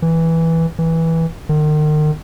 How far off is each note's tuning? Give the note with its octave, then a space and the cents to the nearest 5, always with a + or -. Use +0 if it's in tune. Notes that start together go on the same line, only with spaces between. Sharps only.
E3 -5
E3 -10
D#3 -40